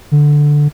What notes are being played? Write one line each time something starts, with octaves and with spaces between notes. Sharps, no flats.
D3